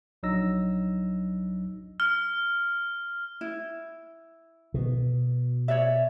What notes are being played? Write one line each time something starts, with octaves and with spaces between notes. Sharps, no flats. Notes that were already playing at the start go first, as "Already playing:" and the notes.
A#1 F#3 D4 D#4 E6 A#6
F6
E4
B2
C#5 D5 E5